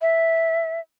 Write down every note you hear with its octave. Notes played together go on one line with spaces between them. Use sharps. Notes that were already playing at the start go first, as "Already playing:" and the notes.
E5